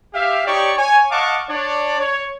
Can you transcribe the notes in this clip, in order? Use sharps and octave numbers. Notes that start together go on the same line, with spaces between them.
G4 E5 F5
D#4 G4 C#5 D5 G5 C#6
C#5 G#5
D#5 F5 F#5 A5 C#6 D6
D4 C#5 D5
C#5